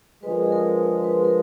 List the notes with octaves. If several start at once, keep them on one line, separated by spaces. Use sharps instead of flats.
D3 F3 G#3 B4
A#4
G#4
A#4
B4
A#4